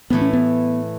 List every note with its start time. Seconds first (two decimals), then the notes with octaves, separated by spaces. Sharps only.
0.10 A2 E3 A3 B3
0.21 C#4
0.33 B3